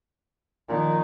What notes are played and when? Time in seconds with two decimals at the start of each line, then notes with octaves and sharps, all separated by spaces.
0.69 A#2 D#3 F3